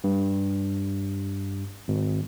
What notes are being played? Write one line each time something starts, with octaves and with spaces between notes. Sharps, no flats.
G2
G#1